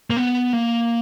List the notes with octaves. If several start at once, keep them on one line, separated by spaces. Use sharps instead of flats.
A#3
B3
A#3